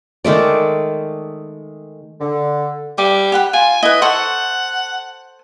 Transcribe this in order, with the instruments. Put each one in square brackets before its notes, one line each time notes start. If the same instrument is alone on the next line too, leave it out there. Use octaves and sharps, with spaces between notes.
[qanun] D#3 G#3 A3 D5
[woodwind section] D3
[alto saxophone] G3 [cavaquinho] D6
[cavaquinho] G4 F#5 B5
[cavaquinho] F4 [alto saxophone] G#5
[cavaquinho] E4 B4 [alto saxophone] D#5
[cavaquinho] A4 C5 C#6 [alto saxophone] F#5